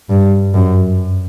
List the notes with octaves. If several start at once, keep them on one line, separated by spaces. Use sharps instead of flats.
G2
F#2